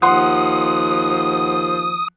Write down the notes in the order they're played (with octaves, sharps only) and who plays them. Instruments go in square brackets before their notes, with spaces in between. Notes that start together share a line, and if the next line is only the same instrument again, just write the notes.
[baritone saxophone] D#2 [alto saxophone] F3 [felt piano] F#5 C6 [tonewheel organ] D#6